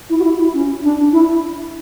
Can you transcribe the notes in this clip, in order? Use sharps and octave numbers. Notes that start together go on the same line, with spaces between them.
E4
F#4
E4
E4
C#4
D4
E4